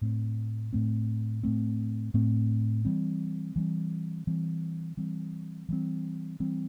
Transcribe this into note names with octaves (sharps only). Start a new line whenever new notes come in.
A2 A3 C4
A2 A3 C4
A2 A3 C4
A2 A3 C4
E3 G3 C4
E3 G3 C4
E3 G3 C4
E3 G3 C4
E3 G3 C4
E3 G3 C4